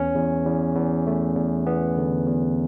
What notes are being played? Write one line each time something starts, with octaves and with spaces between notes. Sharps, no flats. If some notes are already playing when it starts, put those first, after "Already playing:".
Already playing: E2 C#4
E2
E2
E2
A3
E2
E2 B3
D3
E2